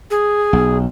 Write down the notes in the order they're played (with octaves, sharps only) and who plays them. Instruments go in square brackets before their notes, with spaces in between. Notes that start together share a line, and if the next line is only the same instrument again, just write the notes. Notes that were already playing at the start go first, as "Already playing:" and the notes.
[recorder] G#4
[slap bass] B1